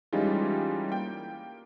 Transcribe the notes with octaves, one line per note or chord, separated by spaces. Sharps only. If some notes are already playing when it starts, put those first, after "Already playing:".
E3 G3 G#3 C#4 D#4 F4
A#3 G5